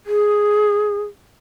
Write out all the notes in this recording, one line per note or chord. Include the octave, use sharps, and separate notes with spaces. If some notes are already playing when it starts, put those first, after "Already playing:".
G#4